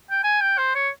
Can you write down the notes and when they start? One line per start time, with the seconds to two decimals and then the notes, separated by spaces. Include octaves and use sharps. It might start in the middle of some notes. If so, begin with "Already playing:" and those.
0.10 G5
0.23 G#5
0.41 G5
0.58 C5
0.75 C#5